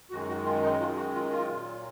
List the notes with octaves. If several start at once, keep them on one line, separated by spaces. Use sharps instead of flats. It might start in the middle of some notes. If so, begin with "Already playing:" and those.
F#2 D#3 G#3 F#4
F#4
F4
D#4
F4
F#4
F4
F4
A#2 F#3